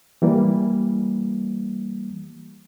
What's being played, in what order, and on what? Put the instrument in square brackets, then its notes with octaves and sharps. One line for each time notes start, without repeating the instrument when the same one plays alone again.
[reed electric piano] E3 G3 A#3